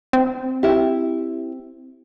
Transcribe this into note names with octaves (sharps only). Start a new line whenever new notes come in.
C4
E4 G4